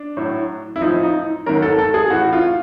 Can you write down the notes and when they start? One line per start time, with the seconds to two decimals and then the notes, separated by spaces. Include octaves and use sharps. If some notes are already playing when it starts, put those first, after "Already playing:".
Already playing: D4
0.17 A2 F#3
0.76 E4
0.81 A2 F3 D#4
1.03 D#4
1.46 G#2 D#3 F#3 A#4
1.62 A4
1.79 A4
1.94 G#4
2.10 A2 E3 F#4
2.33 F4